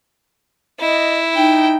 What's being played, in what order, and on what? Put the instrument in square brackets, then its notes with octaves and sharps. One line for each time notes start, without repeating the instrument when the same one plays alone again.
[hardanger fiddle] E4 [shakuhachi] D#5
[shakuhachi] D#4 [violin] G5